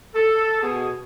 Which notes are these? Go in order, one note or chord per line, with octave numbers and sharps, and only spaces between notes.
A4
B2 G#4